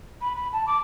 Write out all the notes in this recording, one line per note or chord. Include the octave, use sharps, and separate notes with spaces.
B5
B5
A5
D6